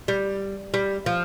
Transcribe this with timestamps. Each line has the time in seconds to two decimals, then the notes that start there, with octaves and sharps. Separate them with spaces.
0.08 G3
0.74 G3
1.06 F3